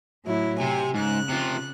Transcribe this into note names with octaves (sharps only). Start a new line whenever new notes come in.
A2 F#3 E4
C3 G#5
G#2 C#3 F#6
C3 F4